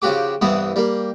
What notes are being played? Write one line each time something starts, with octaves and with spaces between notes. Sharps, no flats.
C#3 F3 F#4 G4 D6
C2 G2 E3 B3 D#6
G3 A#3